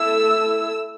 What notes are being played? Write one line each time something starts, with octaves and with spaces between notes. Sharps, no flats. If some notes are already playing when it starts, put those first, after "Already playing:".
Already playing: A3 E4 A4 E6